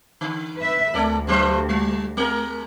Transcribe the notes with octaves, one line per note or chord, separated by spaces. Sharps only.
D3
B4 E5
D2 G#3 A4 D5
G2 F#3 C5
G3
G#3 A#4